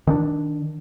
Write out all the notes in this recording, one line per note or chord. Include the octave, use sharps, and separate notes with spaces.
D#3 C4 D4